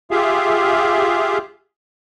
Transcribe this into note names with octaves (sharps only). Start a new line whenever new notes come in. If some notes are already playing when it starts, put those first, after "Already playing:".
F4 G4 G#4 E5 F5